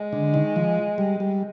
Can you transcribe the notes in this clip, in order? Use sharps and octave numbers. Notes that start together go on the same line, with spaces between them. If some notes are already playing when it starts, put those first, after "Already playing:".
Already playing: G#3
D3
D#3
F3
G3
G3